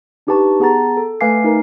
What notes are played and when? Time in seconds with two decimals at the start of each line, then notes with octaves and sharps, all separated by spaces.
0.27 D4 D#4 G4 B4 A5 C#6
0.60 B3 G#4 F#5 A5 A#5 A6
0.97 A4
1.21 A3 B4 F5 G#5 D6 C7
1.44 D#4 A#4